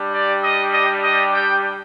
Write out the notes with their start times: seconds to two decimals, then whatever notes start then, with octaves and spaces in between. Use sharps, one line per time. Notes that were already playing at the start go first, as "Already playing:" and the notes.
Already playing: G3 D4 G4
0.14 D5
0.43 D#5
0.73 D#5
1.04 D#5
1.34 G5